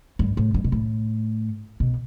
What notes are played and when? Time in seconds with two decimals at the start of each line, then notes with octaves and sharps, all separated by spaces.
0.19 G2
0.37 A2
0.54 G2
0.64 B2
0.72 A2
1.80 B2